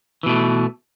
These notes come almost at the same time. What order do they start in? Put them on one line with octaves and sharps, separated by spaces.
E3 B2 A3